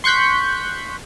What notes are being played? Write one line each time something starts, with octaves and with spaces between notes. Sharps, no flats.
C6 C#6 F#6 G6 B6